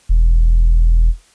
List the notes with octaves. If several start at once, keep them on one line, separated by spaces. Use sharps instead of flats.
E1